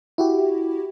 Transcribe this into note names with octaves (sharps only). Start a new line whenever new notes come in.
E4 F#4 G4